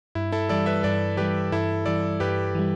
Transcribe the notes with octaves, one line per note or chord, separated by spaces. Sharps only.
G2 E4
E4 A4
E3 G3 A4 D5
B4 E5
G2 A4 D5
E3 G3 G4 B4
G2 E4 A4
E3 G3 A4 D5
G2 G4 B4
E3 G3